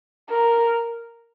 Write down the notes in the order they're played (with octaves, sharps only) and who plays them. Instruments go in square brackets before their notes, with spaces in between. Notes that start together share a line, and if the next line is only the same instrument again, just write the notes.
[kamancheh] A#4